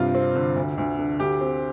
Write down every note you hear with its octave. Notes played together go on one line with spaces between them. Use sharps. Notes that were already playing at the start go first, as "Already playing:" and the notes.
Already playing: G2 C3 F4
C4
D3
D2
D2
D3
D2 G4
C4